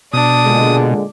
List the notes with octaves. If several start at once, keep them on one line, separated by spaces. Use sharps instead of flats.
B2 D4 D#6
A#2 D3 G#3